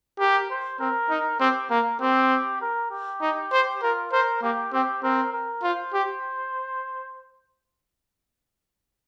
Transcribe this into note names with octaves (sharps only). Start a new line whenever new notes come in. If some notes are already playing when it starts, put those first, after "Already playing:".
G4 A#4
C5
C4 A#4
D#4
C4 G4
A#3 A#4
C4 G4
A#4
G4
D#4
C5
F4 A#4
A#4 C5
A#3 G4
C4 G4
C4 A#4
A#4
F4 C5
G4